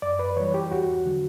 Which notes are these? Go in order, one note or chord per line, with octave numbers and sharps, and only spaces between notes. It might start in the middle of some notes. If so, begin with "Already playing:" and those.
F#2 D5
B4
E3 G3 C#5
G4
E2 F#4
D3 F#3